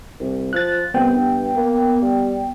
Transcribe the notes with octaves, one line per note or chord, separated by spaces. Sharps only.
C2
F3 F#6 A6
C2 B3 G5
G2
A#3
G3